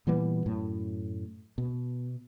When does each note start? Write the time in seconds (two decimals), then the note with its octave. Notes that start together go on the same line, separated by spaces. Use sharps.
0.07 A#2 E3 G3 B3
0.46 F#2 A2
1.58 B2